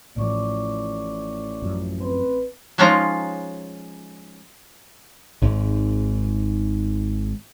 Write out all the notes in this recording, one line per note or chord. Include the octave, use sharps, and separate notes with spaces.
A1 A2 E3 F3 D5 C#6 D6
F#2 F3
C4 B4
F3 G#3 C#4 D#4 F4 A#5
G#1 G#2